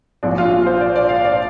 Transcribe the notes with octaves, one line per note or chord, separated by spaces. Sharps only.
A#1 A#2 F3 D4
F4
F4
C5
D5
D5
F5
D5